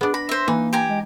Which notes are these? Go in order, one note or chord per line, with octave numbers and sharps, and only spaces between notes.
B3 D4 G#4
B5 A#6
C5 E5
E3 A#3 D#4
G4 G#5 A#5
G#3